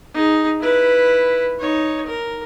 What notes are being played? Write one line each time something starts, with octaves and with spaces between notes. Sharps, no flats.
D#4 G#4
E4 B4
D#4 C#5
A#4